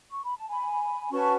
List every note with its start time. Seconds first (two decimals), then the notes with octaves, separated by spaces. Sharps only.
0.10 C#6
0.24 B5
0.37 A5
0.49 G#5 B5
1.12 C#4 F#4 B4 A5 C#6